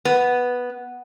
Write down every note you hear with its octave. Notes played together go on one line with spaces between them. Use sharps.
B3